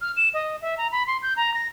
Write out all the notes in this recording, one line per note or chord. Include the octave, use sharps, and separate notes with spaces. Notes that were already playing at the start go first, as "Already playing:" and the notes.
F6
E7
D#5
E5
A#5
B5
C6
G6
A#5
A#6